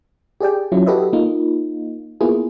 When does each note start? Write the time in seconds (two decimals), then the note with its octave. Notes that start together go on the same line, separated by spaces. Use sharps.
0.40 G4 G#4 D5 G5
0.72 F#3 C#4 E4 F4
0.86 F#4 G4 A4 B4 D#5 E5
1.13 A#3 D#4 F4
2.21 A#3 B3 E4 F4 G#4